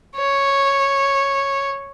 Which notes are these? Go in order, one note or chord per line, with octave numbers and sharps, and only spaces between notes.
C#5